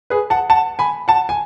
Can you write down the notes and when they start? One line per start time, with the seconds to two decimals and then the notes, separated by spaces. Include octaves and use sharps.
0.10 G#4 B4
0.30 F#5 A5
0.50 F#5 A5
0.79 G#5 B5
1.08 F#5 A5
1.29 G#5